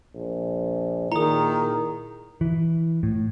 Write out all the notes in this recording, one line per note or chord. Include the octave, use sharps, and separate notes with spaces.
A#1
A#2 D#3 E4 G#4 A#5 D#6
E3
A2